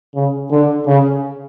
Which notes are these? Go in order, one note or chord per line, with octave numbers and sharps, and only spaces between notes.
C#3
D3
C#3